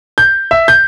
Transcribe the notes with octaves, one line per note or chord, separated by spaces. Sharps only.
G6
E5
G6